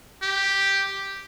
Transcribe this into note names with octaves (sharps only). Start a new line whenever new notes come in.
G4